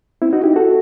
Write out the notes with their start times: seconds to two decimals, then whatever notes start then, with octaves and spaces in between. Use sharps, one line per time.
0.22 C4 E4
0.33 D#4 F#4
0.44 E4 G4
0.56 F#4 A4